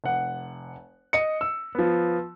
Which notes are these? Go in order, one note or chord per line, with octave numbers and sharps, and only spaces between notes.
F1 F#5
D#5 C#7
E6
F3 B3